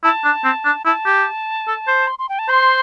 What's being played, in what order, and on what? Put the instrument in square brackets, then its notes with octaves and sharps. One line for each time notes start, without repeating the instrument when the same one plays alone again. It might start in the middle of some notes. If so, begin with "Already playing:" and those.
[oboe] E4 [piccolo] A5
[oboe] D4
C4
D4
[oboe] E4 [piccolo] A5
[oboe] G4
A4
C5
[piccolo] C6
C6
G5
A5
[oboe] C5 [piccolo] C6